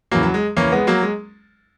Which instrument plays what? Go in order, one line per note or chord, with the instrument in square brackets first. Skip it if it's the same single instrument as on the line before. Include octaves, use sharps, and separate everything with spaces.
[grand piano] E2 C#3 E3 F#3 A#3
F#3
G#3
E2 C#3 E3 A#3 C#4
G#3 B3
F#3 A#3
G#3